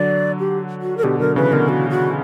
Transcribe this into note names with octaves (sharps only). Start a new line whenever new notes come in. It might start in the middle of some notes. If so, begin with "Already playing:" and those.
Already playing: D3 F#3 D5
G4
F#4
A#4
B2 D3 G4
D3 F#3 A#4
C#3 E3 B4
B2 D3 A#4
F#4
F#4